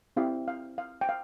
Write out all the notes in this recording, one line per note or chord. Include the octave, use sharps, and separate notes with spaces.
C4 E4 G4 F5
F5
F5
G5
F5